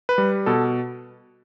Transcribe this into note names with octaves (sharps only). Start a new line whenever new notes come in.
B4
G3
B2 A4